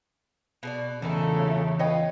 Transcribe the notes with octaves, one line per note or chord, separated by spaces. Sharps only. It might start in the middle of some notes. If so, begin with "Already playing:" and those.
B2 G#4 D5
E2 A#2 C#3 A3 D#4 E4
F4 B4 C#5 D#5 G5